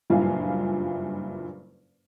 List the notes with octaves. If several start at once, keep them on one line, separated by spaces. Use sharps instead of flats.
F#1 G2 A#2 E4 F5 G#5